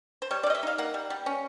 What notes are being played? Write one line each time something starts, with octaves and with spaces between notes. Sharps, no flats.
C5
G3 C#5
D5
G3 D#5
E5
D#4 F5
A#3 F#5
G3
G3
C#4